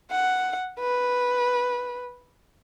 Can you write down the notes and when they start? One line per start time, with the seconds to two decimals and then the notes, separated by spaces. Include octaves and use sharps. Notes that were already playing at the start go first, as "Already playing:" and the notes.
0.11 F#5
0.79 B4